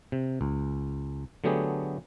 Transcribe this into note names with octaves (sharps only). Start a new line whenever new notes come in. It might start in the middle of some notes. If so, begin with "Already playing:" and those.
C3
C#2
D3 F#3 A3 B3 G4 G#4